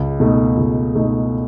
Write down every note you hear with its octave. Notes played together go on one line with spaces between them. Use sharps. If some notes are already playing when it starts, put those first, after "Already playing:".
Already playing: C#2
B2 A3 D#4
C#2
B2 A3 D#4